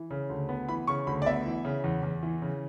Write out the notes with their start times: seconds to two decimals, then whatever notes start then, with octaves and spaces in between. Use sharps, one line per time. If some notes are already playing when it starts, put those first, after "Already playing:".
Already playing: E3
0.11 C#3
0.29 D2
0.49 B3
0.69 E3 B5
0.87 C#3 C#6
1.07 D2 B5
1.22 D5
1.26 B3 E5
1.46 E3
1.65 C#3
1.84 E2
2.03 E2
2.23 E3
2.42 C#3